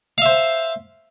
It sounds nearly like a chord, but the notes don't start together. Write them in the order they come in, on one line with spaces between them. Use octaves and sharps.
F5 E5 C5